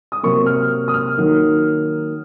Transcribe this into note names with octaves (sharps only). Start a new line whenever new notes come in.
D#6
C3 F#3 A#3 C#6
F6
D#6
F6
D#3 F#3 A#3